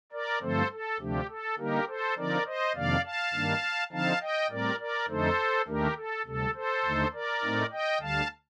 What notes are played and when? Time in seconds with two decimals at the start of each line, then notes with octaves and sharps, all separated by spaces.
0.12 A#4 D5
0.41 G2 D3 F3 A3 C4 A4 C5
0.71 A4
1.00 D2 C3 F3 A3 D4 G4
1.29 A4
1.58 D3 G3 A#3 D#4 G4 A#4
1.88 A4 C5
2.17 D3 F3 C4 D#4 A#4 D5
2.46 C5 D#5
2.75 F2 C3 D#3 A#3 D4 D5 F5
3.05 F5 A5
3.33 G2 D#3 A#3 D4
3.92 D3 F3 C4 D#4 F5 A5
4.21 D#5 G5
4.50 A2 G3 C4 A#4 D5
4.79 A#4 D5
5.09 F2 D3 A3 D#4 A4 C5
5.67 D#2 D#3 A3 D4 G4 A#4
5.97 A4
6.26 D2 C3 G3 A4
6.55 A4 C5
6.85 D#2 D3 A3 D#4
7.13 A#4 D5
7.43 A2 A3 C4 D#4
7.72 D#5 G5
8.01 D2 D3 G3 F5 A5